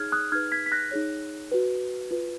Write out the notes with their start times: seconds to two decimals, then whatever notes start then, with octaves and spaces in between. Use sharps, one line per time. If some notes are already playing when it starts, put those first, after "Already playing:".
Already playing: D#4 G#4 C#5 F6 G#6
0.12 D#6 F#6
0.32 D#4 G#4 B4 F6 G#6
0.52 G#6 B6
0.66 B6
0.72 F#6 A#6
0.91 D#4 G#4 C#5
1.52 F#4 B4
2.11 F4 B4